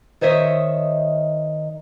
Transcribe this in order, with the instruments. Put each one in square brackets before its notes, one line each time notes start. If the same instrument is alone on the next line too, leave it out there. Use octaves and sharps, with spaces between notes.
[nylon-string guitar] D#3 C5 C#5 D#5 E5